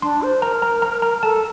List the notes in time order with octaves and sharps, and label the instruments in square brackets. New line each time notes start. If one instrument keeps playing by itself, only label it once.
[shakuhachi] D4 [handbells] C6
[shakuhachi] C5
[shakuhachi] A#4 [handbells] A#5
[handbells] A#5
A#5
A#5
[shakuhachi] A4 [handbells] A5